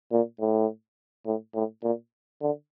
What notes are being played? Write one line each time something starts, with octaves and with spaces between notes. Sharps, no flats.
A#2
A2
A2
A2
A#2
D3